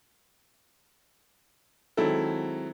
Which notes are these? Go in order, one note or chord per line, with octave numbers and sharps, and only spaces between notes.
D#3 F#3 G#3 C4 E4 A4